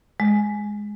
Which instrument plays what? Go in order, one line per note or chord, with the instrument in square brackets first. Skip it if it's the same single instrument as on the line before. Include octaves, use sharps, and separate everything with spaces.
[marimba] G#3